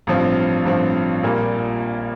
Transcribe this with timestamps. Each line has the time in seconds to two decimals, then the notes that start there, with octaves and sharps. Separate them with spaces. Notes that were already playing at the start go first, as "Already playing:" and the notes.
0.07 A1 G2 F3 C4
0.65 A1 G2 F3 C4
1.23 A#1 A#2 G3 A#3